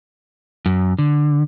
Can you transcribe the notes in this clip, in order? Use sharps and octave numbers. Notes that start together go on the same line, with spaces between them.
F#2
D3